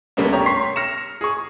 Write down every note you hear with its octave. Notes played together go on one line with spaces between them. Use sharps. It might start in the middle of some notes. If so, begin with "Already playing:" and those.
D2 G3 A#3 B3 C#4
G4 C#5 A#5
C6 C#6 B6 C7
F6 A#6 C#7 E7
G#4 C#6